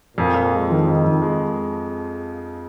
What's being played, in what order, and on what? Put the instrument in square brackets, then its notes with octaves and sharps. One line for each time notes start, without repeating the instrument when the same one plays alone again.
[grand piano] F2 [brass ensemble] A#2
[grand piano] F2
G#3
[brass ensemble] D#3 [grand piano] F3
[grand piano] F2
F2
G#3